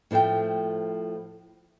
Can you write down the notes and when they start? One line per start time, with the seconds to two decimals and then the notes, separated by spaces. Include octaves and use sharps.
0.11 A2 F3 A3 C4 G5